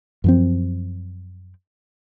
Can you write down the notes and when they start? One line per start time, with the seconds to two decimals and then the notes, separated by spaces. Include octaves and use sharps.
0.24 F#2 F3 C4